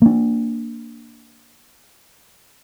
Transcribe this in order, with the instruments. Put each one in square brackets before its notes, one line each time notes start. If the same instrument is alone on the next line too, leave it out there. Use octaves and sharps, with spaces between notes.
[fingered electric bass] A#3 D4